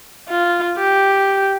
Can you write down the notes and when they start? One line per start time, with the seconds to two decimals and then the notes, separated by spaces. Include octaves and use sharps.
0.29 F4
0.77 G4